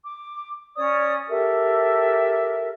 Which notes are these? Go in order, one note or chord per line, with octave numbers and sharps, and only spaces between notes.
D6
C#4 C#5 D5 D#6
G4 A4 A#4 E5